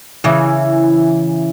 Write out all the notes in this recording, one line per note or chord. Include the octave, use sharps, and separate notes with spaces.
C#3 E3